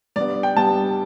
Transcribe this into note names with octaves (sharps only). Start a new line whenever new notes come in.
G2 G3 B3 D5
G5
G2 G3 B3 A5